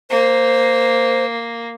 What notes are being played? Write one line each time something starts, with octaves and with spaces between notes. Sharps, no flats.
A#3 C5